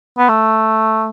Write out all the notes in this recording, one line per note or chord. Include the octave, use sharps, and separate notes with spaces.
B3
A3